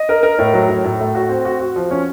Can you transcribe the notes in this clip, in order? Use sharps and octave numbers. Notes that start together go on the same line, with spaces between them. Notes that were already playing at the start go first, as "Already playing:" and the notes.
Already playing: D#5
A#4
A#4
A2
F#3
A2
A2
A3
F#4
C4
F#4
F#4
F3
C#4